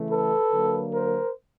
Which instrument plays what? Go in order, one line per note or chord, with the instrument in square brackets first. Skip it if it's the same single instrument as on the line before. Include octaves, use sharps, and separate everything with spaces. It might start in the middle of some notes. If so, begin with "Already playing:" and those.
Already playing: [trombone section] C#3 E3 A3
A4 B4
D3 F#3 A#3
A#4 C5